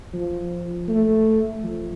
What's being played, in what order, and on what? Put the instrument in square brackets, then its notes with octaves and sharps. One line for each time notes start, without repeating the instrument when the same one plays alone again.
[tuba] F3
A3
F3